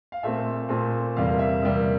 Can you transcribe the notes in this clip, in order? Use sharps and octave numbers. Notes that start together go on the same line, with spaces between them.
F5
A#2 A3 C4 E5
A#2 A3 C4
E2 C3 G3 A#3 F5
E5
E2 C3 G3 A#3